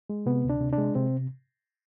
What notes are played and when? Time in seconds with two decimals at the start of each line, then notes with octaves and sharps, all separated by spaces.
0.10 G#3
0.26 C3 B3
0.44 D2
0.49 D4
0.60 C3
0.72 D4
0.78 G#3
0.95 C3 C4